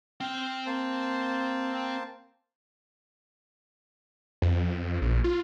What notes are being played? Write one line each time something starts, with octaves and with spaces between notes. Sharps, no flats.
C4 G5 F6
A#3 C5 A5
F2
A#1
F4